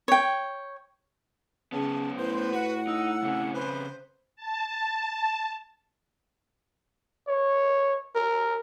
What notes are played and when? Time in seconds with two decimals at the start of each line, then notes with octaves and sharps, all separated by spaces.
0.08 C#5 G5
1.72 C#3 B3 C#4 A5
2.17 A2 B4 C5
2.52 F#4 F#5
2.87 D#4 E6
3.22 C#3 C4 C#4
3.54 B4 C5
4.36 A5
7.28 C#5
8.15 A#4